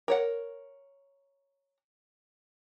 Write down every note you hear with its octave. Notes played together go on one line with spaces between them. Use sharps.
A#4 C#5 F#5